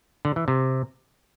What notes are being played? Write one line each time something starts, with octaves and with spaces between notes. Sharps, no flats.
D3
E3
C3